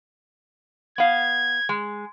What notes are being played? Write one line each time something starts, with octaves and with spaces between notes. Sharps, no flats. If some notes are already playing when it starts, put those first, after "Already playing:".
B3 F5 G#6
G#3